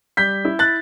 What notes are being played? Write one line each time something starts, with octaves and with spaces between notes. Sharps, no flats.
G3 G6 B6
E4
F#6 A6